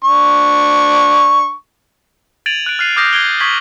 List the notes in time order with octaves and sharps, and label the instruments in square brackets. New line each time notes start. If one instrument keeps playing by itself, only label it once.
[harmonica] D4 C#6
[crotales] G#6 A6 D7 D#7 F7 F#7
F#6 D7
F6 F#6 C7 D#7 F7
D6 D#6 F6 G6 A#6 C7
G#6 C7 D7 G7
C#6 D#6 G#6 B6 F#7